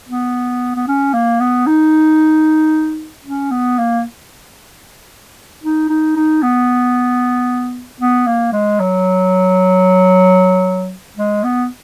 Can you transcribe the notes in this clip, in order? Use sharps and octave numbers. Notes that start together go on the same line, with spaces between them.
B3
B3
C#4
A#3
B3
D#4
C#4
B3
A#3
D#4
D#4
D#4
B3
B3
A#3
G#3
F#3
G#3
B3